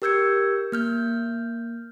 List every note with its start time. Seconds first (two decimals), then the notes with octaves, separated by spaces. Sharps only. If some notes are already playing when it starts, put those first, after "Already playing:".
0.02 G4 A#4 E6 G6 G#6 C#7
0.72 A#3 F6 G6